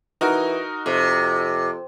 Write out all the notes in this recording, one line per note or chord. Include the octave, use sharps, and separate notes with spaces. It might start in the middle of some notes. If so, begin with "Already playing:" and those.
E3 D#4 F#4 A#4
F2 C3